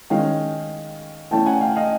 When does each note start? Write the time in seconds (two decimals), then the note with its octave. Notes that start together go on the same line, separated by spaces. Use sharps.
0.10 D#3 G#3 C#4 F5 G5
1.31 E3 A3 C#4 G5 A5
1.46 F#5 G#5
1.61 F5 G5
1.76 D#5 F5